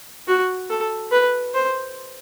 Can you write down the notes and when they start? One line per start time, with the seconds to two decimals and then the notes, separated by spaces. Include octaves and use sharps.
0.28 F#4
0.70 A4
1.12 B4
1.54 C5